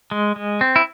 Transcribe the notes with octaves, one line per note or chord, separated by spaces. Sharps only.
G#3
G#3
C4
E4